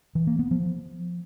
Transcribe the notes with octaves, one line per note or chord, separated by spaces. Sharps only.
E3
A#3
B3
F3